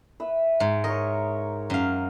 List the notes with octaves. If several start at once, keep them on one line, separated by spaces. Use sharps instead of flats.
B4 E5
G#2
A#4 C#5 D#5
F#2 F5